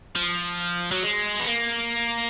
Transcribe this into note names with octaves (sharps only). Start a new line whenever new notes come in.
F3
F#3
G#3
B3
A#3